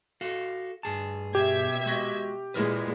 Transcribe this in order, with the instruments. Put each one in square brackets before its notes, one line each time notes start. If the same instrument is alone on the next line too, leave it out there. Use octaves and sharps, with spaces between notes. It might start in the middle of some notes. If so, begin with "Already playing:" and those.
[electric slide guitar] F#4 A4 F5
G2 G#4 A5
[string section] B2 E5 G#6 [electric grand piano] G4
[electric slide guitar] G#3 F#4 D#5
[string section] A#2 G#3 [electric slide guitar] E4 A#4 B4